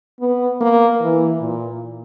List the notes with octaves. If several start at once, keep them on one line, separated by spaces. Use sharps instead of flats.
B3
A#3
E3
A#2